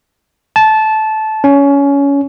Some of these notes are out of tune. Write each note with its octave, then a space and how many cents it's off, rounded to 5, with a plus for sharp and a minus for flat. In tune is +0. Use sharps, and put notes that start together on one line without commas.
A5 -15
C#4 +20